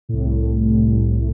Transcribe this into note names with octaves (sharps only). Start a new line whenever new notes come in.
C2 A2